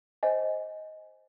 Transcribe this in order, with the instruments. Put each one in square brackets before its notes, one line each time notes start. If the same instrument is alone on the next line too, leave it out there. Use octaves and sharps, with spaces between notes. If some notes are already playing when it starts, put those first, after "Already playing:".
[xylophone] C5 D#5 G#5